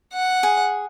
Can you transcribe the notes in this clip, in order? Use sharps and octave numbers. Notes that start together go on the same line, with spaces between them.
F#5
G#4